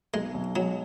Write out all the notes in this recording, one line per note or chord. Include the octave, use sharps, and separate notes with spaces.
B1 G#3
B1
F#3 G#3